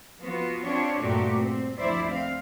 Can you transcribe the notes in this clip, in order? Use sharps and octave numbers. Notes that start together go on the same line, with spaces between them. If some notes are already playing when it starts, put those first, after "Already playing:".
F3 B3 F4 F#4
C4 D4 F4 G4 C#5
G2 A#2 A3 F#4 G4
C4
D2 F3 E4 C5 D5 E5
C4 F5